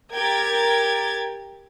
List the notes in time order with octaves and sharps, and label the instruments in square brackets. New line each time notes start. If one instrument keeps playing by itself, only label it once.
[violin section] G4 A#4 G5 G#6 A6